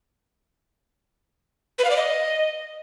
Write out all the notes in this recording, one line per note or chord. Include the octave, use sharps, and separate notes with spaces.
B4
F5
D5
D#5